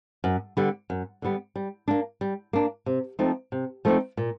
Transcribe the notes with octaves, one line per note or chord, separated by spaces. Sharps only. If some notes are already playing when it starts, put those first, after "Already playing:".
F#2
D3 G3 B3
F#2
D3 G3 B3
G3
A#3 D4
G3
A#3 D4
C3
F3 A3 C4 D#4
C3
F3 A3 C4 D#4
A#2